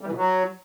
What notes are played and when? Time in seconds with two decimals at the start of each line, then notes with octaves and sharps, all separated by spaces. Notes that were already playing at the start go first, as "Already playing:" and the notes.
0.01 G3
0.06 E3
0.12 B2
0.17 F#3